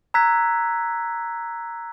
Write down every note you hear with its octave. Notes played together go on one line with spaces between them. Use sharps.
A#5 E6 F#6 G#6 B6